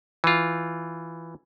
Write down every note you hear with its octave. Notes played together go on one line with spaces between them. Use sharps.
E3 F4